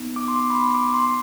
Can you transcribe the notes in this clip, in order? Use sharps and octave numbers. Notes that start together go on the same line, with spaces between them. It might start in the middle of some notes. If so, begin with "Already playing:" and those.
Already playing: B3 D#4
D6
C6
D6
B5
C6
D6
C6